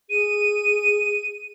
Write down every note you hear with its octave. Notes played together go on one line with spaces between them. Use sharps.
G#4 D#7